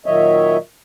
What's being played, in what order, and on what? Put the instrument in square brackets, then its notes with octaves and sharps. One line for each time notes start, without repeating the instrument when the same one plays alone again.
[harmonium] A#2 D#3 F#3 C#5 D#5 E5